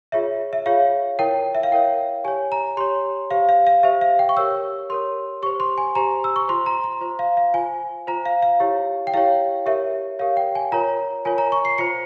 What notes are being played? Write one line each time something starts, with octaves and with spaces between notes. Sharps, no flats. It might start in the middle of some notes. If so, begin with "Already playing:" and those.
F4 G#4 C#5 E5
E5
F4 G#4 C#5 F5
E4 A#4 C#5 G5
E5
F5
E4 A#4 C#5 G5
G4 C#5 G#5
A#5
G4 C#5 C6
G4 C5 F5
F5
F5
G4 C5 E5
F5
G5
C#6
G4 A#4 C#5 E6
G4 A#4 C#5 C6
G4 C5 C#6
C6
G#5
G4 C5 A#5
E6
C#6
F4 C5 C6
A#5
A#5
F4 C5
F5
F5
F4 C5 G#5
F4 C5 A#5
F5
F5
E4 G4 C#5
G5
E4 G4 C#5 F5
G4 A#4 C#5 E5
G4 A#4 C#5 F5
G5
G#5
F4 A#4 C#5 A#5
F4 A#4 C#5 G#5
A#5
C#6
C7
F4 C5 C#7